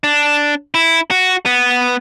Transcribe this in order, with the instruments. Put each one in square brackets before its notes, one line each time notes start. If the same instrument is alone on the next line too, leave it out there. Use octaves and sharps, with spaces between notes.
[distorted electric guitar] D4
E4
F#4
B3